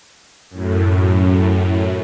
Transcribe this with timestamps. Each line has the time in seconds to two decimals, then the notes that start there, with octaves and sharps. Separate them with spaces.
0.50 F#2 A2